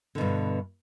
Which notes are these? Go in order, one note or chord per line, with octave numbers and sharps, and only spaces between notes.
G2 B2 D3